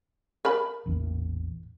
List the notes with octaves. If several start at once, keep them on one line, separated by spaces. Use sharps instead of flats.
A#4 A5 B5
A1 E2 A#2